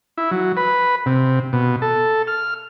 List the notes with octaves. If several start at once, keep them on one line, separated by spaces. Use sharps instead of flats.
E4
F#3
B4
C3
B2
A4
F6